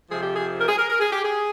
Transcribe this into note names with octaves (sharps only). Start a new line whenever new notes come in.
F2 C3 F3 G#4
G4
G#4
A#4
G#4
A#4
A#4
G#4
G4
G#4